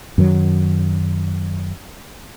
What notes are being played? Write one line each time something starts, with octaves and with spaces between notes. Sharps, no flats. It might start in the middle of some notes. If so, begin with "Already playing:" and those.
F#2 D#3 F#3